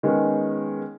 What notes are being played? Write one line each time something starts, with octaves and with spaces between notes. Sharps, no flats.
D#3 G#3 B3 C#4